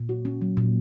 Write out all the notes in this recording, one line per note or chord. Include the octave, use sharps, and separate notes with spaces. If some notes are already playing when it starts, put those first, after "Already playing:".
Already playing: A#2
F#4
C#4
F#3
A#2